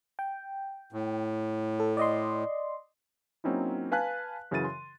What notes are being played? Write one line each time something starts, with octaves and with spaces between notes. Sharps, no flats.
G5
A2
A4
D5 D#5 C6
F#3 A#3 C4 C#4 D#4 E4
B4 F5 G#5 A5 F#6 B6
F#2 C#3 E3 F#4 A6 D#7
C6